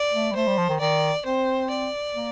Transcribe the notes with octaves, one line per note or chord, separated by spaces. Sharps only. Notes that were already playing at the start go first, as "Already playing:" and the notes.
Already playing: D5
A3
G3
A3 C5
G3
F3
D#3
D#3 D5
C4 C5
D5
A#3